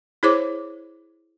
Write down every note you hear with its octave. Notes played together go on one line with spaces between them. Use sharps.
E4 G#4 C5 C#5 D6